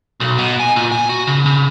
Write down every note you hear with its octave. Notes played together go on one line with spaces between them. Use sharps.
B1
B2
G#5
A#2
G#5
F#4
C#3
C#3